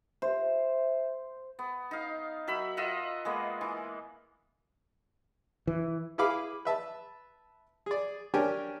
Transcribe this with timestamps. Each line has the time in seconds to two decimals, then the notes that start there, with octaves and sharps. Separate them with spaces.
0.22 C5 E5
1.59 B3
1.91 D#4 F5
2.48 F#3 A#4 E5 B5
2.77 F4 D#5 E5 F#5
3.25 G#3 A#3 B3
3.61 E3
5.67 E3
6.18 E4 G#4 B4 F5 B5 D6
6.65 B4 E5 A5
7.86 G#4 D5
8.34 C#4 D4 G4 A#4 G5 G#5